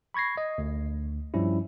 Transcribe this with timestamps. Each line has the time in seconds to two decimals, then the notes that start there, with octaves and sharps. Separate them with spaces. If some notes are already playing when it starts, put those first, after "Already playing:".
0.14 B5 C#6 G#6 A#6 C7
0.37 D#5
0.58 D2
1.34 G2 F3 G3 C#4 E4